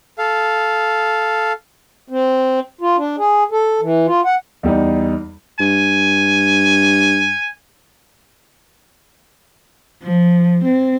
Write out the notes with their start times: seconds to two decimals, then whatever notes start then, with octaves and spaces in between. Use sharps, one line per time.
0.18 A4 F5
2.09 C4
2.81 F4
2.97 D4
3.18 G#4
3.52 A4
3.81 E3
4.07 F4
4.25 F#5
4.63 E2 G3 D#4
5.60 G2 G#5
10.04 F3
10.65 C4